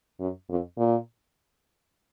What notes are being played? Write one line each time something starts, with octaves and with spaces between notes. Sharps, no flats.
F#2
F2
A#2